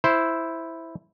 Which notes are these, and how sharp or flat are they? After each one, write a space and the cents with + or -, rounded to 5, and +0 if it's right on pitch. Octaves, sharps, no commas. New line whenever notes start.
E4 +0 C5 +0